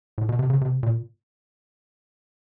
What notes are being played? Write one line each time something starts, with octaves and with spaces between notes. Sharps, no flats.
A2
B2
C3
C#3
C3
A#2